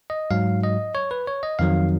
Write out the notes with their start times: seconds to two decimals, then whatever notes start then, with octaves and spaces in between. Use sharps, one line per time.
0.10 D#5
0.31 G#2 F#3 F5
0.64 D#5
0.95 C#5
1.11 B4
1.27 C#5
1.43 D#5
1.59 F2 D#3 F#3 F5